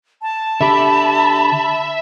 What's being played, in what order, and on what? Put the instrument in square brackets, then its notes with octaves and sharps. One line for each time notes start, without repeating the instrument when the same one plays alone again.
[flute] A5
[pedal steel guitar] D3 G4 [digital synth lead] E5 [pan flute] B5